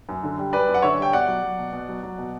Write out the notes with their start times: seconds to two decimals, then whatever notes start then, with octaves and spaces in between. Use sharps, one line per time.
0.09 F#2
0.23 D3
0.38 G3
0.53 F#2 B4 D5
0.67 F#2
0.74 F#5
0.82 D3 C#5 E5
0.97 G3 G5
1.13 B2 D5 F#5
1.28 F#3
1.43 F#3
1.58 B2
1.73 B2
1.89 F#3
2.03 F#3
2.18 B2